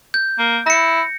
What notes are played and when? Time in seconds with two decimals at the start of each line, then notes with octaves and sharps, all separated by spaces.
0.14 G6
0.39 A#3
0.67 E4 A#6 C#7